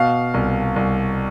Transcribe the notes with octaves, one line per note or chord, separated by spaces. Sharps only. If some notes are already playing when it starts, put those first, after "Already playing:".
Already playing: B2 F5
C2
C2